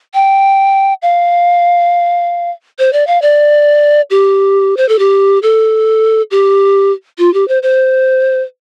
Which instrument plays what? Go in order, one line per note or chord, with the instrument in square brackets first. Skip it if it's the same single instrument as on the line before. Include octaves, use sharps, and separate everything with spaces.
[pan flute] G5
F5
C5
D5
F5
D5
G4
C5
A4
G4
A4
G4
F4
G4
C5
C5